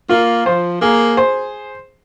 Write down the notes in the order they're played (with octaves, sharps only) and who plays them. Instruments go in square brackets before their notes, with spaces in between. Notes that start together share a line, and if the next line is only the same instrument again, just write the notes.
[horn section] A#3 [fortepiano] F4
[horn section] F3 [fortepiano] C5
[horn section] A#3 [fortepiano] G#4
[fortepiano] C5